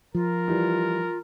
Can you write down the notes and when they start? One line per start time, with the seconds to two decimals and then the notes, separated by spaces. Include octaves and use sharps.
0.15 F3 F4 A#4
0.48 E3 G3